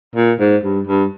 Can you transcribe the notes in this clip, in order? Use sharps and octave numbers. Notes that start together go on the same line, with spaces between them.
A#2
G#2
G2
G2